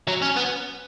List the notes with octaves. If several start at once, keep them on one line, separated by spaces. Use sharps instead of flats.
F#3
C#4
B3